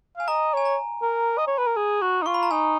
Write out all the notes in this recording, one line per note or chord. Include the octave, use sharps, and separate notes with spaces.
F5 G#5
D#5 A#5
C#5 G#5
A#5
A#4
D#5
C#5
B4
A#4
G#4
F#4
D#4
F4 C#6
B5
A#5
D#4 G#5